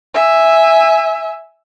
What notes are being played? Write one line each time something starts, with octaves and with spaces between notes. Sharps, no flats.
E5 G#5